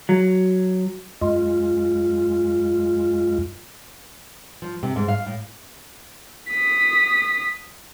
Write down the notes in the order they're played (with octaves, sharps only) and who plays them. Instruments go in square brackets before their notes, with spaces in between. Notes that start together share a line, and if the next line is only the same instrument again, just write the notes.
[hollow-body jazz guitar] F#3
[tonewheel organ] F#2 G#3 F4
[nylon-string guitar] F3
C3
G#2
F5
A2
[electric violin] D#6 B6